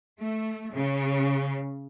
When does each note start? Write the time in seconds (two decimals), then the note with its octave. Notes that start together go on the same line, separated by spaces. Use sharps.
0.19 A3
0.73 C#3